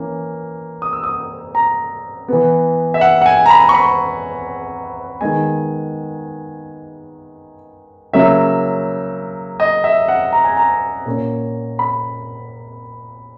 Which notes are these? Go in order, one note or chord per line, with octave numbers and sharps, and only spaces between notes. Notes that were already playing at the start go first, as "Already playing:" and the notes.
Already playing: E3 A#3 C#4
D#6
E6
D#6
A#5
E3 B3
E5
F#5
F#5
G#5
A#5
B5
C#6
B5
D#3 G#3 B3 G#5
C#3 F#3 A#3 C#4 E5
D#5
E5
F#5
A#5
G#5
A#5
A#2 A#3 C#4
B5